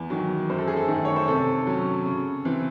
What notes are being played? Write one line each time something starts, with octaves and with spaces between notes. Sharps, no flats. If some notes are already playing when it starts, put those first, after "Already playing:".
Already playing: E2
D#3 F#3
F#2 C5
A4
G#4
A4
D#3 A3
C#5
C5
C3 A4
F#3 C#4
C#3
E3 C4